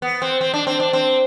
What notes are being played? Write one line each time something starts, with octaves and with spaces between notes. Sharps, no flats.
B3
C4
C4
D4
C4
D4
C4